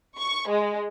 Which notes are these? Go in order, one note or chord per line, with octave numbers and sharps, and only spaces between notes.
C#6
G#3